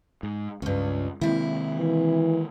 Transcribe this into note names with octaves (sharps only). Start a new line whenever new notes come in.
G#2
C#2 G2 C#4
C3 D#3 G#3 A#3 E4
E3